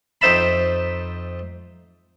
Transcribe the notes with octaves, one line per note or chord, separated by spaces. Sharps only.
F2 D#4 C5 E5 A5 B5